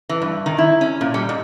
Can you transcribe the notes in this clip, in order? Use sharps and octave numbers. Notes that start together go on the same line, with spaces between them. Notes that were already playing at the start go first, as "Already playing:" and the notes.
E3
G2
D#3
E4
C#4
A#2
G3
G#2